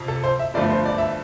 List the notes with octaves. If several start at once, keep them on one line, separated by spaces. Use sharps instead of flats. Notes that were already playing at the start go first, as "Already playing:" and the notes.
Already playing: F2 C3
A4
C5
E5
G1 G2 F3 A3 D5
C5
D5
E5